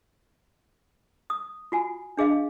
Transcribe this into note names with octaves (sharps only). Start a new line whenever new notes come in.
D#6
F4 F#4 G#5
D4 G#4 D#5 F5